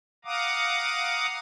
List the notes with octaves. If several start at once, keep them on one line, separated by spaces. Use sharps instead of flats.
F5 F#5 A#5 D6 D#6